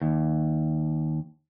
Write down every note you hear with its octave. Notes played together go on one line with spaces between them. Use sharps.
D#2